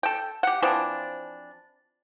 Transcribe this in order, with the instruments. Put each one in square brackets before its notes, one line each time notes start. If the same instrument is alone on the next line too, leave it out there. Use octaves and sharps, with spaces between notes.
[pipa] A4 G5
G4 F#5
E3 F3 C4 D4